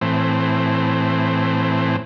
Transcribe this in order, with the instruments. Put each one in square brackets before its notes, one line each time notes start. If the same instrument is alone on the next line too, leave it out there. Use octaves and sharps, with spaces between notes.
[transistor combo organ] A2 E3 C4